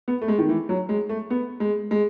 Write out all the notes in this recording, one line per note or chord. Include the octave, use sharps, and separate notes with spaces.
B3
A3
G#3
D#3
E3
F#3
G#3
A3
B3
G#3
G#3